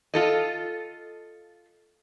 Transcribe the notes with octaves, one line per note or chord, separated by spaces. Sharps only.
F4 A4 D#5